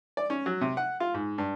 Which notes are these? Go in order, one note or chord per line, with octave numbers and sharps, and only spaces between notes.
D5
C#4
F#3
C3
F#5
F4
G#2
G2